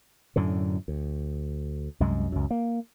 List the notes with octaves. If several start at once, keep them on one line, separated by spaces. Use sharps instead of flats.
F#2 A2 D3
D2
C2 F#2 G#3
C#2 F#2
A#3